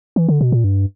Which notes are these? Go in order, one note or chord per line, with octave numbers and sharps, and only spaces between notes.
E3
D3
B2
A#2
G2